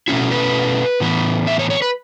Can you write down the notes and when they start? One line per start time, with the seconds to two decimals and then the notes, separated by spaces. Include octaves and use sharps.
0.08 B2 A3 C#4 E4 F#4
0.32 B4
1.00 A2 E3 B3 E4
1.47 E5
1.59 C#5
1.70 C#5
1.82 B4